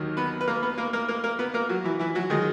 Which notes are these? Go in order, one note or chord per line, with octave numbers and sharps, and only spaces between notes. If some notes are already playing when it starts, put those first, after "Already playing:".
Already playing: D#2 D#3 F#3
B3 B4
B4
A#3 A#4
B3 B4
A#3 A#4
A#3 A#4
A#3 A#4
A#3 A#4
B3 B4
A#3 A#4
F#3 F#4
E3 E4
E3 E4
F#3 F#4
D#3 F#3 G#3 G#4